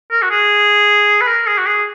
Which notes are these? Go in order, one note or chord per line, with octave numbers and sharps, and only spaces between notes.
A#4
F#4
G#4
B4
A#4
G#4
F#4
G#4